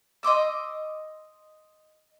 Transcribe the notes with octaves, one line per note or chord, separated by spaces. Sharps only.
D#5 C6 D6 E6